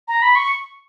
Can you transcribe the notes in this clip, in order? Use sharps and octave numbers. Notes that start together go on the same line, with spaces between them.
A#5
B5
C#6